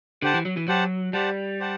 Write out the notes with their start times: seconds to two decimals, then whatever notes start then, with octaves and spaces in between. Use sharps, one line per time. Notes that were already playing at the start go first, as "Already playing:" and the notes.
0.22 D3 G4 C5 F#5 A5
0.34 E3
0.45 F#3
0.57 E3
0.68 F#3 G4 C5 F#5 A5
1.13 G3 G4 C5 F#5 A5
1.60 G4 C5 F#5 A5